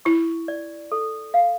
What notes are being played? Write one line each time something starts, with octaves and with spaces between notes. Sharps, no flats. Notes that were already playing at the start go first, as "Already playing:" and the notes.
E4 C#6
D5
A4
F5